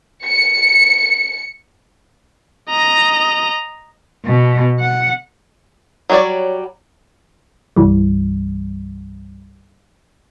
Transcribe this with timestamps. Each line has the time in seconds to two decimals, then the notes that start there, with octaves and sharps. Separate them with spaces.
0.25 C#7
2.70 D#5 A#5
4.26 B2
4.80 F#5
6.10 F#3 G3 D#4 C#5 D5
7.76 C2 G2 E3 G3